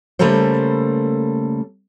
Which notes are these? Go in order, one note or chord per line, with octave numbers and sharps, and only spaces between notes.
C#3 G3 A3 A#3 A4 C5